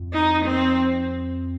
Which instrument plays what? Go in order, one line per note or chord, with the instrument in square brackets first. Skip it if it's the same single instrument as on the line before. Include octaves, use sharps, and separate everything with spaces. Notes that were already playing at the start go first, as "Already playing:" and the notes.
Already playing: [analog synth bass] F2
[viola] D#4
C4